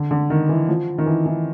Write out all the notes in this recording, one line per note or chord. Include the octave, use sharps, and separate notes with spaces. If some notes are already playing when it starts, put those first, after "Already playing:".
Already playing: D3
D3
D#3
E3
F3
D#3
E3
E3